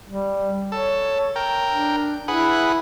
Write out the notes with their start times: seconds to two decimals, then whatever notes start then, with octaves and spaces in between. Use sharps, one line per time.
0.08 G3
0.72 A4 C#5
1.36 A#4 G5
1.70 D4
2.28 E4 G#4 B4 F#5